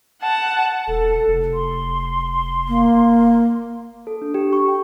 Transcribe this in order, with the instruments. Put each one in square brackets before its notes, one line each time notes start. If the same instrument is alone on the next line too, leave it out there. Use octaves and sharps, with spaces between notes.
[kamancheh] F#5 A5
[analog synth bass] E1 [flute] A4
[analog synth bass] F1
[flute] C6
[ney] A#3
[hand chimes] A4
D4
G4
C#6
G5